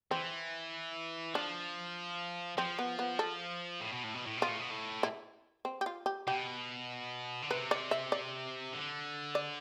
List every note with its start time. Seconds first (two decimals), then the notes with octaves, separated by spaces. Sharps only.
0.11 E3 C4
1.34 F3 D4
2.57 F3 C4
2.79 B3
2.99 B3
3.19 A4
3.81 A2
3.92 B2
4.04 A2
4.14 B2
4.26 A2
4.37 B2 F4
4.49 A2
4.60 B2
4.70 A2
5.03 E4
5.65 C4
5.81 G4
5.86 F4
6.06 G4
6.27 B2 G4
7.42 D3
7.50 C3 B4
7.71 D5
7.91 E5
8.12 D5
8.73 D3
9.35 D5